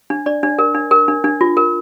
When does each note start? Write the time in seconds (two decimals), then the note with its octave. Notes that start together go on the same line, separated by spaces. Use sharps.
0.10 D4
0.26 D4 D5
0.43 D4
0.59 A#4
0.75 D4
0.91 A#4
1.08 D4
1.24 D4
1.41 F4
1.57 A#4